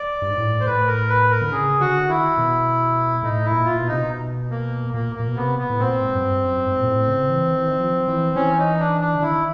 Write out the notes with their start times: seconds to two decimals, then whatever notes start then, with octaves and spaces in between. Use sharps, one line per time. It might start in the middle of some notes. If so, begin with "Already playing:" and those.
Already playing: D5
0.22 G2
0.30 G#2
0.38 A2
0.60 C5
0.66 A2 B4
0.87 A#4
1.09 B4
1.31 A#4
1.42 D3
1.51 C#3 G#4
1.80 D3 F#4
2.09 D#3 E4
2.38 B2
3.23 A2 D#4
3.45 E4
3.52 A#2
3.65 F4
3.79 B2
3.87 C3 D#4
3.99 B2
4.51 A#3
4.94 A#2 A#3
5.16 A#2 A#3
5.28 B2
5.37 C3 B3
5.58 B3
5.70 A2
5.80 A#2 C4
6.01 G#2
6.14 F#2
6.22 G2
6.43 F#2
6.65 G#2
6.79 A#2
6.87 A2
7.08 C#3
7.30 E3
7.51 D#3
7.59 E3
7.67 D#3
7.79 F3
8.08 E3
8.36 E3 C#4
8.58 D#4
8.79 D4
9.01 D4
9.15 D3
9.22 D#3 E4